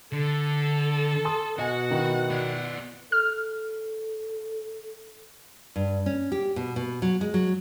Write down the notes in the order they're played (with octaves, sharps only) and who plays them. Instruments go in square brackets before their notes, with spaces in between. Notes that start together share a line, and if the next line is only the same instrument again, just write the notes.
[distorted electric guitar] D3 [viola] A4
[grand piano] A5 C6 D#6
[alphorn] B2 [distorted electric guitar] F#4 [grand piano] D#5 G#5 [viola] F#5
[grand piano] D#3 E4
[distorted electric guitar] B3 D5
[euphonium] A4 [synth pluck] F6
[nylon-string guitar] G2
C#4
G4
B2
B2
F#3
G#3
F#3